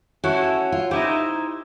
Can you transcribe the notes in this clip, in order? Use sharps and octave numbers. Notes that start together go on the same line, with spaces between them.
C#4 E4 F#4 A4
F4
D#4 E4 G4 C5